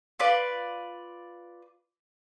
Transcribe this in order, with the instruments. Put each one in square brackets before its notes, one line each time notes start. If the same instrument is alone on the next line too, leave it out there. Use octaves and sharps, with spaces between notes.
[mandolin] F4 B4 D5